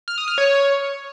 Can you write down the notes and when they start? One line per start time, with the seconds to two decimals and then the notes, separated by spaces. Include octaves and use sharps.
0.08 F6
0.18 D#6
0.28 F6
0.38 C#5